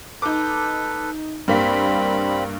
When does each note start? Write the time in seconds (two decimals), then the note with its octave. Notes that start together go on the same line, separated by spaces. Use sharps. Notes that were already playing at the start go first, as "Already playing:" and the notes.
0.22 D#4 A4 B4 D6
1.48 G2 G3 A#3 C4 B5 B6